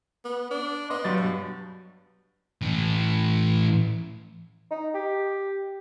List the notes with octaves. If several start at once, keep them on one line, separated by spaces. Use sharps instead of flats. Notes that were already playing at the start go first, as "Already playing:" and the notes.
B3
D4
B3 D#5 C6
G2 F#3 A6
B2
A2 E3
D#4
G4